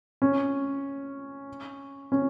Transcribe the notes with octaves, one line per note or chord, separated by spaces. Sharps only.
C#4
C#4